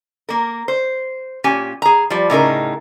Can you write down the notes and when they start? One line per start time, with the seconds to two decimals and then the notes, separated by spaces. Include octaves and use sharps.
0.29 A#3 A#4
0.68 C5
1.44 A#2 C#4 G4 G#5
1.82 G#4 A#5
2.10 F3 G3
2.30 A2 C#3 D#4 A#4